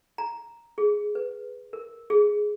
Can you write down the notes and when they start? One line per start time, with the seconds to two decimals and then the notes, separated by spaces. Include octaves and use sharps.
0.18 A#5
0.78 G#4
1.15 B4
1.73 A#4
2.10 G#4